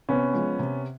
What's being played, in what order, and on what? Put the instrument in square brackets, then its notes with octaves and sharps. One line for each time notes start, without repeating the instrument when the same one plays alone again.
[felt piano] C3 [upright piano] B3 C#4
[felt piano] F3 G#3
C3